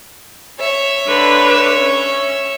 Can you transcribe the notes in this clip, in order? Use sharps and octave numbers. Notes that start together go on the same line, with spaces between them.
C#5 E5
D3 B4
C#4